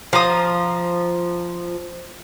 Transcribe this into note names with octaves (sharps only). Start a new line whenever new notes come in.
F3 F5 A#5 D#6